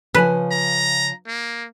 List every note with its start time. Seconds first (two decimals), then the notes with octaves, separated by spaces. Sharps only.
0.15 C#3 F3 B4 G#5
0.51 A#5
1.27 A#3